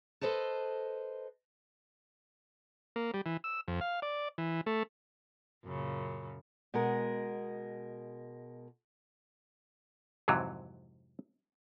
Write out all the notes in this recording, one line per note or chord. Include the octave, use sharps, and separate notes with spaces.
A4 B4 C5 D#5 A5
A#3
G3
E3
E6
F2
F5
D5
E3
A3
F#2 A#2 C#3
B2 G#3 A#4
F2 G#2 C3 E3 F#3